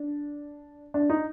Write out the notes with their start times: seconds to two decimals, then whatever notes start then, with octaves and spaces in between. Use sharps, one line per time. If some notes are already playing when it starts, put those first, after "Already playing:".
Already playing: D4
0.94 D4
1.10 D#4